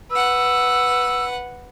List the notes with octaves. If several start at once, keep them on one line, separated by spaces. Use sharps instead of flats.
B4 F#5 E6